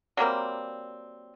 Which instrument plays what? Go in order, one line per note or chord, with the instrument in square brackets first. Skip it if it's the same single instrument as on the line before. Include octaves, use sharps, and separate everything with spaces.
[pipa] F#3 G3 A#3 C4